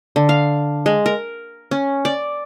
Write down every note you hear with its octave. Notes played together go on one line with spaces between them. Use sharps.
D3
F5
G#3
A#4
C#4
D5